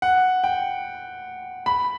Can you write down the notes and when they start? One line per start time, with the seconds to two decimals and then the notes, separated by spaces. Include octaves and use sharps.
0.02 F#5
0.44 G5
1.66 B5